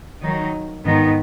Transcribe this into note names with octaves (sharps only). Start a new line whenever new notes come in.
D#3 F#3 D#4
G#2 D#3 B3 D#4